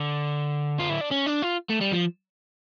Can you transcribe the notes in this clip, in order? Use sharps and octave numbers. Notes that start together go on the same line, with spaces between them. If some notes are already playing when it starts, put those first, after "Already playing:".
Already playing: D3
F4
E4
D4
C#4
D4
F4
A3
G3
F3